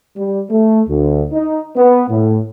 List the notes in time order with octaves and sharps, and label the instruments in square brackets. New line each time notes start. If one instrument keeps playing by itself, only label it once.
[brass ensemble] G3
A3
D2
D#4
B3
A2